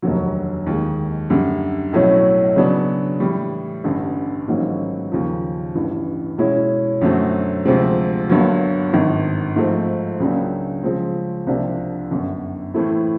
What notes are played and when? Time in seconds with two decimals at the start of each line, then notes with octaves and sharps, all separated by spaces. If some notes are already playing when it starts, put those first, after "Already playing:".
0.02 F1 D#2 D3 F#3
0.66 D#2 D#3 G#3
1.30 F#2 D3 G3
1.93 B1 A2 F#3 A3 C#4
2.56 C#3 F#3 B3 D4
3.20 A2 E3 G3
3.84 A1 G2 D3
4.48 A1 G#2 D#3 F#3 A#3
5.12 D#2 C#3 F3
5.75 A1 G2 E3
6.38 B2 G#3 C#4 E4
7.01 F#2 D3 F#3 A3 C4
7.65 D2 C3 F3 G#3 C4
8.29 G1 G2 D3 F#3 A#3
8.93 G#1 G2 D#3
9.56 G#2 F3 A3 C4
10.20 C#2 C#3 F#3 A#3 D4
10.83 C#3 F3 G#3 C4
11.47 C2 C3 F3 A#3 D4
12.11 G1 F#2 D3
12.74 A2 E3 A3 C4 E4